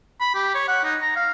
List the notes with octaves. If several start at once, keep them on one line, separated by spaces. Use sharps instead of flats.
B5
G4
C#5
F#5
D#4
A#5
F5